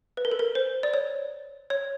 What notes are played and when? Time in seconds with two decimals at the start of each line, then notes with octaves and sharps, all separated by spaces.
0.17 B4
0.25 A#4
0.32 A4
0.39 A#4
0.55 C5
0.83 D5
0.94 C#5
1.70 C#5